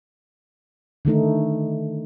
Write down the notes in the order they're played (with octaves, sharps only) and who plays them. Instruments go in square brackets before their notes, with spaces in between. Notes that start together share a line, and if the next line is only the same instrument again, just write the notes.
[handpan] D3 D#3 A3 D#4